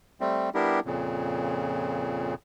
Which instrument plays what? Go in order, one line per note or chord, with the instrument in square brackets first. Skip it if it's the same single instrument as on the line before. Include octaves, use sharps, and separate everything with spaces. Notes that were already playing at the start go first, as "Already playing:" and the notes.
[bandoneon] G3 A3 C4
G3 B3 D4 E4 G4 A#4
F2 A#2 C#3